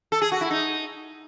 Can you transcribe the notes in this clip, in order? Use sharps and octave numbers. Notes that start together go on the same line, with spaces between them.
A4
G#4
F#4
E4
D#4